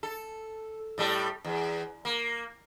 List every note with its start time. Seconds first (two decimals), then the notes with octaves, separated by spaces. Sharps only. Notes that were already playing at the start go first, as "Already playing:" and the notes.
0.03 A4
0.98 A2 G3 A4
1.45 E2
2.05 A#3